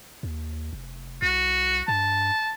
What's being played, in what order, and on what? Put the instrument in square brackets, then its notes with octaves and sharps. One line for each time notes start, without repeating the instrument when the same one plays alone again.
[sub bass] D#2
F1
[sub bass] C2 [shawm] F#4
[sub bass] G2 [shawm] A5